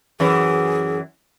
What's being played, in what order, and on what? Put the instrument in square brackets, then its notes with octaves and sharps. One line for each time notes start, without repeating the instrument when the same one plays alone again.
[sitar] F#2 E3 [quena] G#4